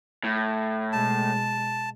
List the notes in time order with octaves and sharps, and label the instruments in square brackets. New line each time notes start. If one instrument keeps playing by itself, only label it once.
[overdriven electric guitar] A2
[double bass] B2 G#3 [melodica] A5